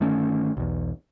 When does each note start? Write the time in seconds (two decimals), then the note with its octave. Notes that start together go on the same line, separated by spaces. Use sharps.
0.01 G1 D#3 A3 C#4
0.57 B1 E2